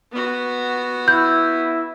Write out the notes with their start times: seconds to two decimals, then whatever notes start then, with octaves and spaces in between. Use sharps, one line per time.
0.12 B3 F#4
1.08 E4 G6